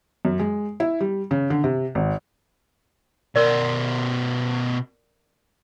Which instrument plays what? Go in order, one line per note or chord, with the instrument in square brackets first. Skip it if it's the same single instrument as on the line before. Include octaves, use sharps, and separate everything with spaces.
[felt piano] F#2
G#3
E4
G3
C#3
D3
C3
G#1
[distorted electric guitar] B2 C5 [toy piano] A#4 D5